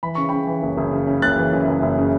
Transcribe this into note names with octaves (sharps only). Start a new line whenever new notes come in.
E3 B5
C#3 C#6
C#3 G5 B5
E3
F#1
F#1
C#3
C#3
F#1 F#6 A6
E3
F#2
F#1
F#1
C#3